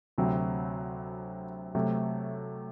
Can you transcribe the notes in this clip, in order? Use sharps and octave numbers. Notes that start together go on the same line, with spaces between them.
D2 C3 F#3 C4
C3 F#3 A3